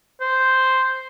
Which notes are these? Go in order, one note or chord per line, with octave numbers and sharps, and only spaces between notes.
C5